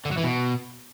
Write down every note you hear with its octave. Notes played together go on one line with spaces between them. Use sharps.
D3
F#3
E3
B2